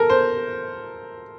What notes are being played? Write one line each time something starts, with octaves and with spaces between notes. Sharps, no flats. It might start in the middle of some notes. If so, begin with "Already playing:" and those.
Already playing: A4 A#4
C5